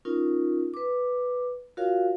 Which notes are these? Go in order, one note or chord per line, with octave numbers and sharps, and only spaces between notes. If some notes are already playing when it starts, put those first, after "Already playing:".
C#4 D#4 F4 A#4
B4 D6
F4 F#4 A#4 C#5 F5